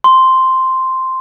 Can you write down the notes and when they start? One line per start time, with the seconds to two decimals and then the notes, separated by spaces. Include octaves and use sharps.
0.04 C6